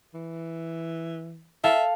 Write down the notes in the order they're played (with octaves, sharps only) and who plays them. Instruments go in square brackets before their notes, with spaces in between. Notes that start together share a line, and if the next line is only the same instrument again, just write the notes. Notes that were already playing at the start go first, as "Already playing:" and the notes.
[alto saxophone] E3
[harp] A4 F5 [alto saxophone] E5